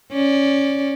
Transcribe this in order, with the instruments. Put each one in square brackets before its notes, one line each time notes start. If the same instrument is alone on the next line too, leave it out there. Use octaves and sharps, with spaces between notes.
[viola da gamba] C#4 D5